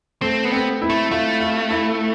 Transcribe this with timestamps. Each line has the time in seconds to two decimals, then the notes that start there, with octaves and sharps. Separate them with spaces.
0.22 A3 C4
0.45 B3
0.52 C4
0.82 E4
0.90 A3
1.11 A3 F4
1.40 F4
1.70 E4